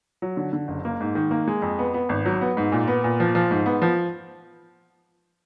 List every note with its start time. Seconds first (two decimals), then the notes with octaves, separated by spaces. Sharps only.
0.22 F#3
0.37 D3
0.53 D3
0.68 F#1
0.85 A#3
1.01 G#2
1.15 D#3
1.31 A#3
1.48 G#3
1.62 F2
1.79 B3
1.94 B3
2.09 G#1
2.26 F#3
2.41 B3
2.57 G#2
2.72 A#2
2.88 B3
3.04 A#2
3.20 F3
3.35 F3
3.51 G#2
3.66 B3
3.82 F3